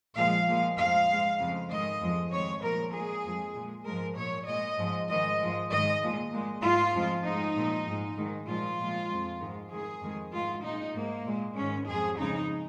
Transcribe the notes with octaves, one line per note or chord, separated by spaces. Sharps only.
A#2 F3 G#3 F5
A#2 F3 G#3
F2 F3 G#3 F5
G#2 G#3
F2 C#3 G#3
G#2 D#3 G#3 D#5
F2 F3 G#3
F2 D#3 G#3 C#5
A#2 F3 G#3 A#4
A#2 G#3 G#4
F2 F3 G#3
A#2 G#3
G#2 F3 G#3 A#4
A#2 G#3 C#5
A#2 G#3 D#5
G#2 F3 G#3
G#2 D#3 G#3 D#5
G#2 F3 G#3
G#2 D#3 G#3 D#5
A#2 F3 G#3
A#2 G#3
G#2 G#3 F4
F2 F3 G#3
G#2 G#3 D#4
A#2 F3 G#3
G#2 G#3
G#2 D#3 G#3
A#2 F3 G#3 F4
A#2 F3 G#3
F2 F3 G#3
G#2 D#3 G#3
G#2 D#3 G#3 G#4
F2 D#3 G#3
G#2 G#3 F4
A#2 G#3 D#4
G#2 G#3 A#3
A#2 G#3
G#2 D#3 G#3 C#4
F2 F3 G#3 G#4
F2 C#3 G#3 D#4